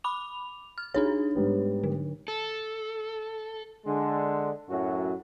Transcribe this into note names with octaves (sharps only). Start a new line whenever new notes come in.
B5 D6 F7
F6
D4 D#4 G#4 C#5
G#2 G3 B3
D3
A4
D3 G#3
F#2 A2 F#3 F#4